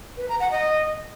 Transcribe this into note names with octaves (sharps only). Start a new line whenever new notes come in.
B4
A#5
F#5
D#5